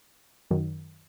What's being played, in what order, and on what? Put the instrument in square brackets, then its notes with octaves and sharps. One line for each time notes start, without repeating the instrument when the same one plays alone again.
[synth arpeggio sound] F#2 D#3 F#3